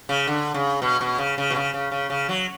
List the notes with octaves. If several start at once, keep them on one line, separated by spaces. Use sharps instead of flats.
C#3
D3
C#3
B2
B2
C#3
C#3
B2
C#3
C#3
C#3
C#3
F#3